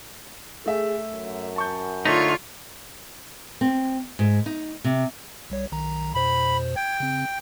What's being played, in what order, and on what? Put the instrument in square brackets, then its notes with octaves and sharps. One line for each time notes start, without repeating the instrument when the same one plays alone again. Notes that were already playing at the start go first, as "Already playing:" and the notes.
[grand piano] A3 E5 [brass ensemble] G#4 A4
[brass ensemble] F#2
[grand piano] A5 C#6 G6
[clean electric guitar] D3 A3 D#4 [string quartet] F4 C#5
[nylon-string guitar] C4
G#2
D#4
C3
[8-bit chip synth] B1 G3 C#5
B1 D#3 A#5
[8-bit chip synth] F2 B2 C5 [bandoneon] B5
[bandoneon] G5 [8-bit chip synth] G#6
[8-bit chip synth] C#3 C4